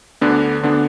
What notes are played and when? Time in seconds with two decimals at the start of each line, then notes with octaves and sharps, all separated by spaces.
0.21 D2 D3 B3 D4
0.63 D2 D3 B3 D4